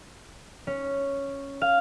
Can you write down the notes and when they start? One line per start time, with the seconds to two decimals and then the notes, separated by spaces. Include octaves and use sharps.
0.67 C#4
1.61 F5